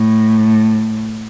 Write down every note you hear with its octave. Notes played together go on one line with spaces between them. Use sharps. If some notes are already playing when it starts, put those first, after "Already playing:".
Already playing: A2